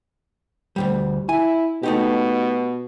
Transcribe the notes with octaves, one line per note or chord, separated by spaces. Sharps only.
D2 G#2 G3
E4 G#5
B2 A3 D#4 G4